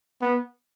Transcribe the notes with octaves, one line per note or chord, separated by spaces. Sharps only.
B3